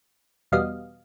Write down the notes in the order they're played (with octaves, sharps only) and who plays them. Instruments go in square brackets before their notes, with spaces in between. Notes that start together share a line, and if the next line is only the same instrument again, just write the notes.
[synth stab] E2 B2 G3 B3 D#5 F5